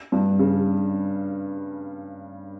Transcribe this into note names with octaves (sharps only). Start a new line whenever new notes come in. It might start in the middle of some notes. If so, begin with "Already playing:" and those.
G2
C#3